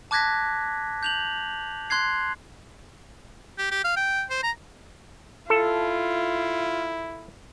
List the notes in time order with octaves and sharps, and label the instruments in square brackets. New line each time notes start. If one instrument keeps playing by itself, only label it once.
[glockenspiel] A5 D6 F#6 G#6 A#6 B6
G6 F7 F#7
C6 F#6 G#6 C7
[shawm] G4
G4
F5
G5
C5
A#5
[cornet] E4 [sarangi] F4 [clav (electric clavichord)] A4